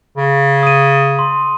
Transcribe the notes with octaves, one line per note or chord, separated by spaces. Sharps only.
C#3
D#6 D#7
C6